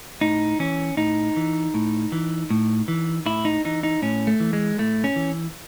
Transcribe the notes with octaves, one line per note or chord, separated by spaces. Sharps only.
A2 D#4
E3 C#4
A2 D#4
E3
A2
E3
A2
E3
A2 E4
D#4
E3 D#4
D#4
A2 C#4
A3
E3
G#3
A2 A3
C#4
E3